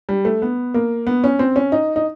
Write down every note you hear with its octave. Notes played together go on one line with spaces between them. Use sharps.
G3
A3
B3
A#3
B3
C#4
C4
C#4
D#4
D#4